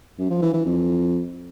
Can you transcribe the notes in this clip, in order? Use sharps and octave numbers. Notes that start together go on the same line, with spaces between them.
F#2
F3
E3
E3
F2